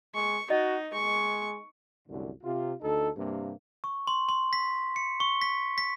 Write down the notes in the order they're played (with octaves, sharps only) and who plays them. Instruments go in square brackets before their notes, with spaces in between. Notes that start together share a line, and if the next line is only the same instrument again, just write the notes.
[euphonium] G#3 [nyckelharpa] C#6
[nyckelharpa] D#4 [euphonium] F#4 [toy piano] D#5
[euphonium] G#3 [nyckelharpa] C#6
[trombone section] C2 F#2 A2 D3
C3 F4
D2 D#4 A4
G2 C3 A#3
[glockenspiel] C#6
C6
C6
B6
C#7
C#6
B6
B6